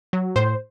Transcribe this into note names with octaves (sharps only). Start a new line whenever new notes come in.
F#3
A2 C5